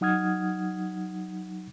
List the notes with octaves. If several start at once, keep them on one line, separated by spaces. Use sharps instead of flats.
F#3 D#4 F#5 D#6 F6 G#6